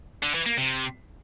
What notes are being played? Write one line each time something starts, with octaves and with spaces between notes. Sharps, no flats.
D3
E3
A#3
C3